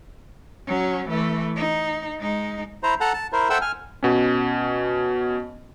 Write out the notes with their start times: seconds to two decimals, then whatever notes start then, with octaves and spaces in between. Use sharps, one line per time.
0.67 F#3 C#4
1.09 E3 A3
1.56 D#4
2.19 G#3 D#4
2.83 E4 C5 A#5
3.01 A4 F#5 A5 A#5
3.14 A5
3.33 E4 A#4 C5
3.50 A4 C5 E5 F#5 G5 E6
3.61 G#5 F6
4.03 B2 C#4